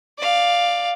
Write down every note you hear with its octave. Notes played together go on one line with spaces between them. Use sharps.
D5 F5